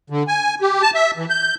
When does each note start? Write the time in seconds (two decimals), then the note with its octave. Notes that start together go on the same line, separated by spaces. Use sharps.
0.10 D3
0.28 G#5
0.61 G4
0.82 A5
0.94 E5
1.17 E3
1.30 G6